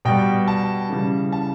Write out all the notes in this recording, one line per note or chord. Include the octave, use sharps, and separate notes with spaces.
B2 G3 G5
A5
C#3 E3 G3
A5